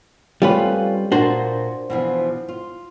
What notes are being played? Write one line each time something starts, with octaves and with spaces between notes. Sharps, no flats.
G3 A3 C4 C#4 F4 B4
A#2 A#3 D4 F#4 C5
B2 E3 F3
F4